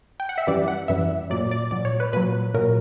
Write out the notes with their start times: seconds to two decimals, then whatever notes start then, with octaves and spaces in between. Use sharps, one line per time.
0.20 G5
0.29 F#5
0.38 E5
0.47 F#2 E3 G3 D5
0.68 F#5
0.88 F#2 E3 G3 E5
1.30 A#2 F#3 D5
1.51 D5
1.71 A#2 F#3 D5
1.85 C#5
2.00 B4
2.13 A#2 F#3 B4
2.54 A#2 F#3 A#4